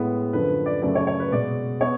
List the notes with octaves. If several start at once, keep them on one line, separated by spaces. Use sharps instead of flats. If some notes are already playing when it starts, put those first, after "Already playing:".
Already playing: A2 G#3 B3
F#2 D3 F3 B4
D5
F#2 C#3 F#3 A3 D5
C#5
C#5
B4
B2 G#3 B3 D5
B3 C#5